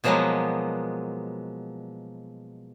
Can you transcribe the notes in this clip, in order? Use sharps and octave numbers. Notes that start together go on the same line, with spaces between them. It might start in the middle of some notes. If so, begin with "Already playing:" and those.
B2 F3 F#3 G#3 A#3 B3